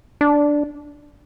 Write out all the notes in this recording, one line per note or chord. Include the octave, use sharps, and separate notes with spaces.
D4